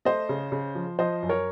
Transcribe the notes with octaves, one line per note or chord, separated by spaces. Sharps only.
A3 C5 D#5
C#3
C#3
F3
F3 C5 D#5
F#2
A#4 C#5